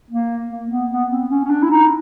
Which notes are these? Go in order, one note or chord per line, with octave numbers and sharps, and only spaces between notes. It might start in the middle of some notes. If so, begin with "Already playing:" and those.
A#3
A#3
B3
B3
C4
C#4
C#4
D4
E4
D#4